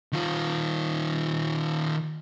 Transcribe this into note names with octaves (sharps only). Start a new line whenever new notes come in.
D#3 F4